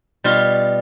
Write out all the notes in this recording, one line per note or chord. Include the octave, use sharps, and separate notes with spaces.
B2 G3 F4